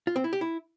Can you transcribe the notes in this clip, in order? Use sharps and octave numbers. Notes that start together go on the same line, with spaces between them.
F4
C4
E4
G4
E4